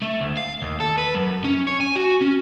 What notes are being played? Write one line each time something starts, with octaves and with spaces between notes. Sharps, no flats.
A3
D2
F5
D#2
A4
B4
F#2
C#4
C#5
G#5
F#4
C#4